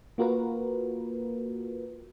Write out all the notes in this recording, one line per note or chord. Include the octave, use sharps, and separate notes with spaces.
A#3 F4 F#4 A#4 B4